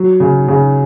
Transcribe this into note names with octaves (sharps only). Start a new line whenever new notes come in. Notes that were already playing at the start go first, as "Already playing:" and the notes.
Already playing: F#3
C#3
C#3